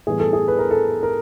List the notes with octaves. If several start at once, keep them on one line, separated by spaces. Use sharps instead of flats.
A2 E3 G3 B3 G#4
A4
G#4
B4
A#4
A4
A#4